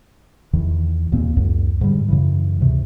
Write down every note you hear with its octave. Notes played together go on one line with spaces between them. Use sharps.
E2 D#3 E3
D#2 A#2 A#3 C4
C#2 F#2
G#2 D3 G3
F#2 C#3 E3
D2 G#2 C3